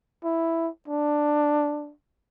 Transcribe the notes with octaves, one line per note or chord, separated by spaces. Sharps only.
E4
D4